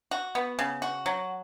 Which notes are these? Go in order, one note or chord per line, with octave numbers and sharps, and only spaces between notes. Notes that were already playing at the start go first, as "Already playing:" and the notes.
F#4
B3
C#3
F#4
F#3